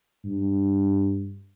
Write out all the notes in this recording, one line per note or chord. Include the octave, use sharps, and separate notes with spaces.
G2